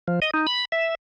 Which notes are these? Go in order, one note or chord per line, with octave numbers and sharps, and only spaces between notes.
F3
D#5
D#4
B5
E5